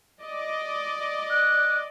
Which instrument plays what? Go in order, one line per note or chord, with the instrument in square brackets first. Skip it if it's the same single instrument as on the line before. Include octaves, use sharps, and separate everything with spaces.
[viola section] D5 D#5
[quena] F#6